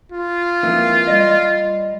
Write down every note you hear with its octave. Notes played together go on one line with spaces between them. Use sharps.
F4
F2 E3 A#3
G3 D5 D#5